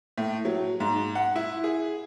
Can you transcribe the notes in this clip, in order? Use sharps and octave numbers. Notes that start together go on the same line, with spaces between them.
A2
F#3
G#2
F#5
E4
G#4